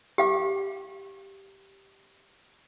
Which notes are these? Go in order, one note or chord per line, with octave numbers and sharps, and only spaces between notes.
G4 F5 D6